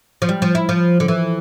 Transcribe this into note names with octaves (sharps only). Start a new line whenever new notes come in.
F3
G3
F3
E4
F3
D3
E3